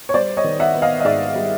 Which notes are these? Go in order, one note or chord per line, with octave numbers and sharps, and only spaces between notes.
C#5
G3 C5 D5
C#5 D#5
D#3
E5 F#5
B3
D#5 F5
D#5
G#2 D5 E5
G3